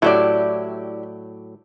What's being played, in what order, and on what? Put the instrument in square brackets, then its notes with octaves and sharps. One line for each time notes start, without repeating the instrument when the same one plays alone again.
[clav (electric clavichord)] A2 F#3 [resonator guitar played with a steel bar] E4 G4 D5